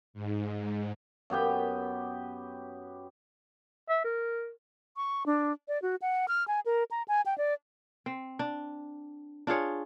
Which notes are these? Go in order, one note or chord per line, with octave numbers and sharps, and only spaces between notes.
G#2
F#2 B3 G4 G5
E5
A#4
C#6
D4
D5
F#4
F#5
F6
G#5
A#4
A#5
G#5
G5
D5
C4
D4
D4 F4 G#4 C#5